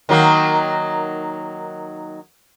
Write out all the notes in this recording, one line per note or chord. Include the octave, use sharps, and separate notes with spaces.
D#3 F#3 A#3